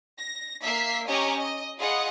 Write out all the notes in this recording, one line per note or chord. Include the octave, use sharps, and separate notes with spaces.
A#6
A#3 E5 B6 C7
C#4 G4 C#5 D#5 G#5 A#5
D#5
F4 G#4 D#5 F#5 B5 D#6